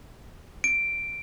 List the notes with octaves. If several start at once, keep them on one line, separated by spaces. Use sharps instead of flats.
D7